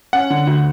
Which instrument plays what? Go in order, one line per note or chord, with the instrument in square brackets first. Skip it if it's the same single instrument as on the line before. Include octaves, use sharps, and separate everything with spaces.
[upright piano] C#4 [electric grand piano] F#5
[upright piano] D3
D2